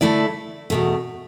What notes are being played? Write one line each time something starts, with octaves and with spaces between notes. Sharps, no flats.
D3 A3 E4 D5
E2 B2 A3